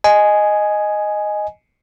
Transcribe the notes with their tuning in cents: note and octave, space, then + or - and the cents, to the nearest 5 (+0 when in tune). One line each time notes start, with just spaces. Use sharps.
D#5 -5 G#5 +5